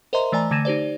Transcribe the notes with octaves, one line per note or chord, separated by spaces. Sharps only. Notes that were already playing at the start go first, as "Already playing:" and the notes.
A#4 C5 D#5 E5 A#5 C6
E3 A3 D5 G#5 A#5
D3 A3 G#6 A#6 D#7 E7
D#4 G4 C5 D5